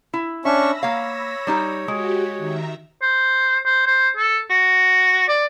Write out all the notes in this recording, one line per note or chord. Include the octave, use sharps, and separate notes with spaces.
E4
C#4 D4 E5 B5 C#6 E6 A#6
A#3 C#5 F5
G3 D#4 G4
G#3 F#4 G4
D#3 E5 A#5
C5
C5
C5
A4
F#4
D5